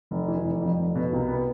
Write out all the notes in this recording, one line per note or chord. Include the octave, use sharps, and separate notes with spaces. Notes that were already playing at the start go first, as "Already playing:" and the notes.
F1
E3
F1
F2
F1
B2
C2
B3